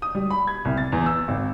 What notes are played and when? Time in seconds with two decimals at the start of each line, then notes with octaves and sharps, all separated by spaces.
0.02 D#6
0.15 G3
0.30 B5
0.47 G#6
0.65 C2
0.77 A6
0.92 E2
1.06 E6
1.28 G#1